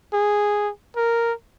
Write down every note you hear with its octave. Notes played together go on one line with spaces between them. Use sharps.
G#4
A#4